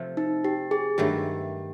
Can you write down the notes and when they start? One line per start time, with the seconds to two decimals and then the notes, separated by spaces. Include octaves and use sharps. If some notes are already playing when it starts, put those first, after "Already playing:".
Already playing: C3 F3 A3
0.17 D#4
0.45 G4
0.71 G#4
0.98 G2 D#3 F#3 A3 G4